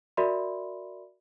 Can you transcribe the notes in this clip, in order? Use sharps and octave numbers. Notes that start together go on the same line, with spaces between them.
F#4 A#4 D5 E5 B5 C6